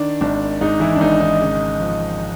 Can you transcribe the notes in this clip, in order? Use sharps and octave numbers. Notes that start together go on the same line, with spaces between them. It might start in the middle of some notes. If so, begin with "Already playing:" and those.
Already playing: D#3 D4
G#1 D4
G#2 D#4
E3 E4
D4
G#1 D#4
D#4
C#3
F3